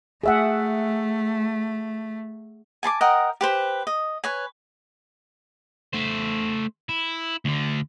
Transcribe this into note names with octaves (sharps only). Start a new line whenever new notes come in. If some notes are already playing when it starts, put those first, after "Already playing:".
A3 G#4 E5 F#5
G#5 A5 C6 D6
A#4 D#5 F#5 G5
G4 B4 C5
D#5
B4 C#5 G#5
A3 C5
E4
D2 D3